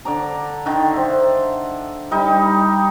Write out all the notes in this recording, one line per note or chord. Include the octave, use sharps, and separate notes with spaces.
D3 D5 A#5
D3 D#3
C5 E5
G3 D#4